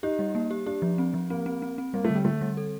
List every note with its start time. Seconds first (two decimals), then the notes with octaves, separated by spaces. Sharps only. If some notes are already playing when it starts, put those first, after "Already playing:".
0.03 D#4 G4
0.19 G3
0.35 A#3
0.51 G4
0.66 D4 G4
0.82 F3
0.98 C4
1.14 F3
1.30 A#3 C4
1.46 C4
1.62 C4
1.78 C4
1.94 G3 A#3
2.05 A3
2.10 D3
2.15 G3
2.25 D3 A3
2.41 G3
2.57 A4